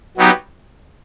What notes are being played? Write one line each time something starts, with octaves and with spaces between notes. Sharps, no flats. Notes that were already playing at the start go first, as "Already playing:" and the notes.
F#3 B3 D#4 G4